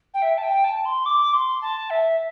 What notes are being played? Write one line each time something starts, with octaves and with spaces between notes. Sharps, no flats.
G5
E5
A5
G5
A5
C6
D6
C6
A5
E5